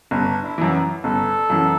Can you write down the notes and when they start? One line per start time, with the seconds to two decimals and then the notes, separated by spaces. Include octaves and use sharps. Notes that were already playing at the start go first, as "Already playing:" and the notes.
0.11 G1 D4
0.43 E4
0.58 F#2 E3
1.04 G1 A4
1.50 F#2 E3